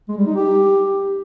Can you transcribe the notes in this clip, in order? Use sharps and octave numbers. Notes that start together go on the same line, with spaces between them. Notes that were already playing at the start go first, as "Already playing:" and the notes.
G#3
G3
D#4
G4